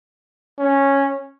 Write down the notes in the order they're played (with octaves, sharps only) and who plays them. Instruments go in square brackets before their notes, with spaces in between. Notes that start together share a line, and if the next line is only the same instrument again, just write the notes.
[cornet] C#4